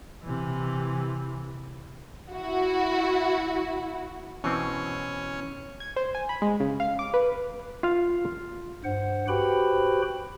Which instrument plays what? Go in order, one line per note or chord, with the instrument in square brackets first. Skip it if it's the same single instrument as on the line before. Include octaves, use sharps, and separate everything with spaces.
[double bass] C3 E3
[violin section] E4 F#4
[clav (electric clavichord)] B2 E3 C4 [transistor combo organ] C#4
[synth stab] G#6
C5
G#5
B5
G#3
C#3
F5
D6
B4
[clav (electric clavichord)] F4 F5
[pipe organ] G2 C5 F#5
F#4 G4 B4 C5 G5 B5